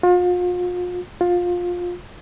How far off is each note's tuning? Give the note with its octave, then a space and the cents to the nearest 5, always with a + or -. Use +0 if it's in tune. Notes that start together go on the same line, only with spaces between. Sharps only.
F4 +40
F4 +20